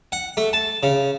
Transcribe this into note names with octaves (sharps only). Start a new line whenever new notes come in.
F#5
A3
A5
C#3